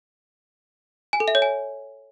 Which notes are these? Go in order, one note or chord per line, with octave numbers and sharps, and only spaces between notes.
G#5
A4
E5
C#5
G#5